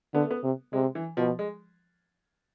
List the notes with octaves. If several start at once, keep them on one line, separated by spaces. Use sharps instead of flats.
D3 B3
A3
B3
C3
C3 G#3
E3
B2 F3
G#3